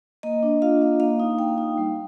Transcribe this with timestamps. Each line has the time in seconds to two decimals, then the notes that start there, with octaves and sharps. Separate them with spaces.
0.23 A#3 D#5
0.43 D4
0.62 F4 F5
0.81 A#3
1.00 A#3 F5
1.20 D#4
1.39 A#3 G5
1.58 D#4
1.78 G3